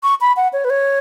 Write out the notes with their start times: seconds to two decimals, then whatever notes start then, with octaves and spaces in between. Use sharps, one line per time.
0.03 C#6
0.21 B5
0.37 F#5
0.53 C#5
0.65 B4
0.70 C#5